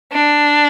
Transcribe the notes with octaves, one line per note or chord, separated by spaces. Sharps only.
D4